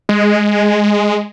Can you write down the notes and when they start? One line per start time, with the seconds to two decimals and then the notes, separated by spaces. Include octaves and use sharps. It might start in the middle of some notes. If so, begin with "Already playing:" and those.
0.09 G#3